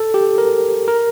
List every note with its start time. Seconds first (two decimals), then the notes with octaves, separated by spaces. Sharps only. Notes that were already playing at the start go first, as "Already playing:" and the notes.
Already playing: A4
0.14 G4
0.38 A#4
0.88 A#4